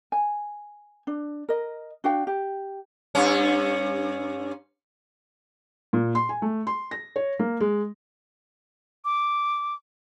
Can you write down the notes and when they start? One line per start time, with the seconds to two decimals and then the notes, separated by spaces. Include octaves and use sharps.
0.12 G#5
1.07 D4
1.49 A#4 D#5
2.04 D4 F#4 F5 G5
2.27 G4
3.15 G2 C#4
5.93 A#2
6.15 C6
6.29 G#5
6.42 A3
6.67 C6
6.91 A#6
7.16 C#5
7.39 A#3
7.60 G#3
9.05 D6